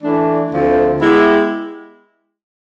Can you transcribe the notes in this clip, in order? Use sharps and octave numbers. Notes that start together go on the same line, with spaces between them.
E3 A3 D4
D2 D3 F3 A3 C4
G#3 B3 E4 G4